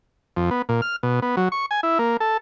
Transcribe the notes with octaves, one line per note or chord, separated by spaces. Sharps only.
F2
B3
A#2
F6
B2
B3
F#3
C#6
G#5
E4
A#3
A4